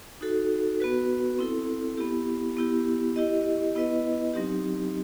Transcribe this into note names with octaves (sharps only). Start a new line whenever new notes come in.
D#4 F#4 A4
B3 F#4 B4
C4 E4 A4
B3 E4 G4
B3 E4 G4
E4 G4 D#5
B3 E4 B4 D#5
F#3 C4 D#4 G4